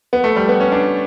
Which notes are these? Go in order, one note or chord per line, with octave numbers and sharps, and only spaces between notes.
B3
A3
G3
B3
C#4
D4